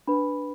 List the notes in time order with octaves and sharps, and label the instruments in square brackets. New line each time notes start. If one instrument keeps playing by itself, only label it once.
[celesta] D4 B4 B5